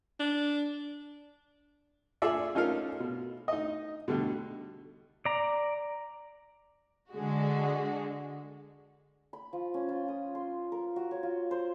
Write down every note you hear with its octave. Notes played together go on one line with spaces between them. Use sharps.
D4
F4 G#4 A4 D5 E5
C#4 D#4 F4 A4 A#4 F5
B2
D#4 D#5
B2 D3 G3 A3
D5 A#5
D3 G#3 F#4
B5
F3
C#4
F4
D#6
C6
A#4
F#4
C#5
F4
C5